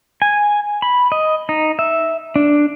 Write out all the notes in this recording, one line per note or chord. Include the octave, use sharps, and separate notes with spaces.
G#5
B5
D#5
D#4
E5
D4